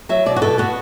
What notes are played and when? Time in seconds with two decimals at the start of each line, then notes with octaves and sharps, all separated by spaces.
0.09 F#3 E5
0.26 B2 D5
0.36 F#4
0.42 B2 A4
0.58 B3 F#4